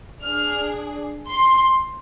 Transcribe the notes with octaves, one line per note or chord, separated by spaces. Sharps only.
D4 G#4 F6
C6